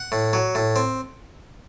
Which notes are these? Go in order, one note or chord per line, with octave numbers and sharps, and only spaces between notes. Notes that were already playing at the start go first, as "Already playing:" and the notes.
Already playing: F#5
A2
F#3
A2
C4